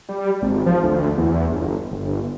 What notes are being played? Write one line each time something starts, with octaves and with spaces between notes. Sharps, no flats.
G3
G#1
F3
D2
E2
G1
G1